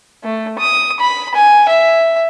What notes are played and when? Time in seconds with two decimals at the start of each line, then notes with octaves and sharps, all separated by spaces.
0.24 A3
0.58 D#6
1.00 B5
1.35 G#5
1.69 E5